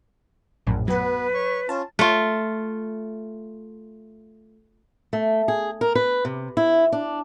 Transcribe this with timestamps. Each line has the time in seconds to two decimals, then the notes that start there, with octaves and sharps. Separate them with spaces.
0.67 A#1 F#2 A2
0.88 F#3 B3 B4 F#5
1.34 C#5 C#6
1.69 C#4 F4 A5
1.99 A3 F4
5.13 A3
5.48 G#4
5.81 A#4
5.95 B4
6.25 C3
6.57 E4
6.92 D4